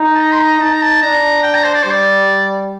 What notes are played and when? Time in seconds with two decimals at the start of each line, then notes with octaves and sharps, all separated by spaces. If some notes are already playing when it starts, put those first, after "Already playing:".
Already playing: D#4
0.14 A5
0.20 A#5
0.32 C6
0.41 A#5
0.61 D#4 A5
0.73 A#5
0.82 A5
1.02 D4 A#5
1.43 G5
1.54 A#5
1.64 C5
1.74 D5
1.83 G3 C5
1.91 D5